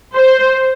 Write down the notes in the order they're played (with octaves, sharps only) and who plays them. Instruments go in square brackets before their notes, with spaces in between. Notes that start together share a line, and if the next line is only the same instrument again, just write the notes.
[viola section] C5